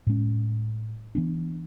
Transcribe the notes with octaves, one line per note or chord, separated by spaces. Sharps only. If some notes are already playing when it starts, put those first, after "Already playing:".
A2 G#3 C#4
E3 B3 D4